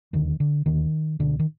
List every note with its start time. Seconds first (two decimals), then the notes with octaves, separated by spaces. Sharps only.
0.13 E1 D#2 D3 D#3
0.40 D3
0.66 E1 D#2 D3 D#3
1.19 C#2 B2 D3
1.39 D#3